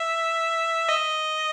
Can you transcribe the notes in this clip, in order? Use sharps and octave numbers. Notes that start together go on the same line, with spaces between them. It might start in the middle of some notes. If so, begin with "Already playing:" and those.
Already playing: E5
D#5